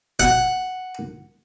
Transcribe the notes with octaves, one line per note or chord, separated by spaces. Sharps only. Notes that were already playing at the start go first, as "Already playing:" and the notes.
F#5